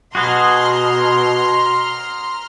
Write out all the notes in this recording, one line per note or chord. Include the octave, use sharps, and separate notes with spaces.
B2 F#4 G#4 B4 A#5 C6 F6